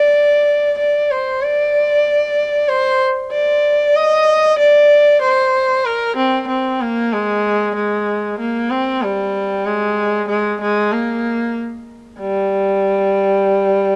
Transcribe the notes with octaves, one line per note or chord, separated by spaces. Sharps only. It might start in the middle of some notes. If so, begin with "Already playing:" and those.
Already playing: D5
D5
C5
D5
C5
D5
D#5
D5
C5
A#4
C4
C4
A#3
G#3
G#3
A#3
C4
G3
G#3
G#3
G#3
A#3
G3